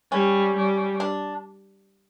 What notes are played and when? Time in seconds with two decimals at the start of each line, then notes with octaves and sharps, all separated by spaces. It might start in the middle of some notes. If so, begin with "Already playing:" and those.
0.12 G3 C#4
0.56 G3
1.00 D4